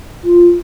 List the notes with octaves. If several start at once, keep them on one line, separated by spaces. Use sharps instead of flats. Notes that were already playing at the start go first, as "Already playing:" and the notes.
F4